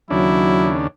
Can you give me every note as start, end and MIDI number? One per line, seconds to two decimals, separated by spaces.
0.10 0.87 39
0.10 0.87 49
0.10 0.74 54
0.10 0.87 62
0.10 0.77 64